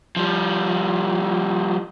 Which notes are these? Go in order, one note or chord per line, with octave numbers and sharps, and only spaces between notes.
F3 G3